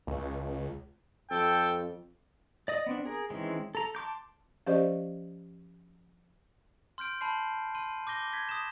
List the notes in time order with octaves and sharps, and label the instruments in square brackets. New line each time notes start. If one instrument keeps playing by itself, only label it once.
[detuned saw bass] C#2
[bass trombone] F2 [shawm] A4 [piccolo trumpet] G5
[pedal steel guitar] D5 D#5 D#6
B3 C4 D4
G#4 A#4
D#3 E3 G#3 C4 C#4
A4 A#5
A5 C6 D6 G6
[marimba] F3 C#4 G4 C5 D5 D#5
[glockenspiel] C6 F6 G6 D7
A5 B5 C6 C7
C6 D#7
D6 G6 A#6 G7
G#6 B6
D#6 E7